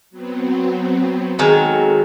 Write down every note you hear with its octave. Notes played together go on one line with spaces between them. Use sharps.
F#3 B3 C4
D#3 F#3 G#3 A4